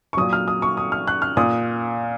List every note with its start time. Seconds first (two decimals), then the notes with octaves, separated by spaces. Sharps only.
0.13 C#6
0.17 A#2 F#3 D#6
0.33 F6
0.48 D#6
0.62 C#6
0.77 D#6
0.92 F6
1.07 F#6
1.22 F6
1.37 A#2 D#6